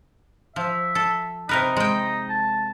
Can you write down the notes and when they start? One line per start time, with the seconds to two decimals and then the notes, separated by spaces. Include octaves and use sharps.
0.56 F3 E5
0.95 A4
1.49 C3 D#4 A#4 B4
1.76 G#3 G5
2.29 A5